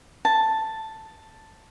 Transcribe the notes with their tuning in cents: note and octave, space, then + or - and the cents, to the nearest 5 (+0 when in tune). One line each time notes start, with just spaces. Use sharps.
A5 +5